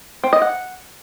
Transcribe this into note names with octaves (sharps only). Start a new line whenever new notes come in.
C4
D#5
F#5